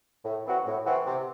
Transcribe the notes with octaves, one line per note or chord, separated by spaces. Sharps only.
A2
E3 C4 F#4
A2
E3 C4 F#4
C3